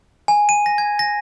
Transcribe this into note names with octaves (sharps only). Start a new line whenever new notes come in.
G#5
D#7
A#6
G#6
A#6